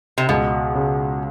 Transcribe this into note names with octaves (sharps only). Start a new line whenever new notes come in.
C3
C#2 B2
C#3